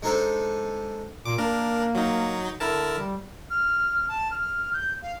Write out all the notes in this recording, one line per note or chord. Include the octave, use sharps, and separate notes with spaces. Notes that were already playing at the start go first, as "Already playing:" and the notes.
G#3 D4 D#4 A4 C5
A#2 D6
A#3 D4 A#4
F#3 D#4
D3 E4 A#4 A5
G3
F6
A5
F6
G6
F5